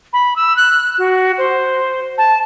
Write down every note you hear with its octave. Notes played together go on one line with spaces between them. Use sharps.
B5
E6
F#6
F#4
C5
A5